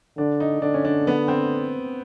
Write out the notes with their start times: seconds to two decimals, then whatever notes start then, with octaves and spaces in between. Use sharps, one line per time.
0.18 D3 D4
0.40 D#4
0.62 D3 D4
0.74 C#4
0.85 D4
1.07 B3
1.28 C4